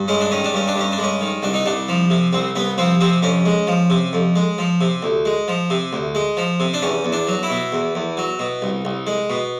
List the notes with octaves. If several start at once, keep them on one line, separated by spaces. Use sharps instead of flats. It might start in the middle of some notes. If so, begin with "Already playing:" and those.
Already playing: G2
G#3 C#4
D4
D#3 C#4
D4
G2 C#4
D4
G2 C#4
D4
G#3
C#4
D#3
C2 D4
D#4
C2 D4
F3
C3
C2 C4
C2 B3
F3 C4
C3 C4
F2 C#4
G#3
F3
C3
F2
G#3
F3
C3
D2
G#3
F3
C3
D2
G#3
F3
C3
D4
E2 C#4
E2
D4
F#3
E4
B2
E2
E2
F#3
B2
C2
C2
G#3
B2